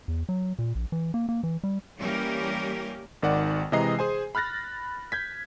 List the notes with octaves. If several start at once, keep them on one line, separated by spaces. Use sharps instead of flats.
E2
F#3
A#2
A#1
E3
A#3
A#3
E3
G3
E3 G3 A#3 C#4 G4 A#4
G#1 D#3 D5 F#5
C3 E3 G#3 D#5 A#5 C7
G#4 C5 G#5
B5 F6 F#6 A6 A#6
G6 G#6 B6